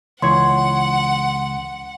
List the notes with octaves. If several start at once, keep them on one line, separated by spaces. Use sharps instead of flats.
C#2 E3 C#5 F#5 C6